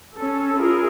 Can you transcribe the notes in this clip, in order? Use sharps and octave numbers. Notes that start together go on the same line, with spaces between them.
C#4 A4
E4 F4 G#4 A#4